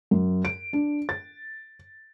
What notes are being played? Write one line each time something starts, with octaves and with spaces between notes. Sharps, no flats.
F#2
D7
D4
A6